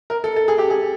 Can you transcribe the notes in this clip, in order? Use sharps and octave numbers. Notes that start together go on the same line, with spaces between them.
A#4
A4
A4
G#4
G4
G#4